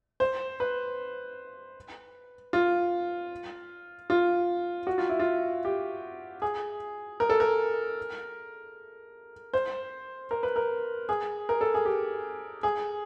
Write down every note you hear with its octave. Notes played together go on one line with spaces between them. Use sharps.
C5
B4
F4
F4
F#4
F4
E4
F4
G4
G#4
A#4
A4
A#4
C5
A#4
B4
A#4
G#4
A#4
A4
G#4
G4
G#4